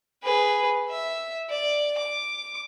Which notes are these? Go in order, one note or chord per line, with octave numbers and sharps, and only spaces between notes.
G#4 B4
E5
D5
D6